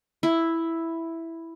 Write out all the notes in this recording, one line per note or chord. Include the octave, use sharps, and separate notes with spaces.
E4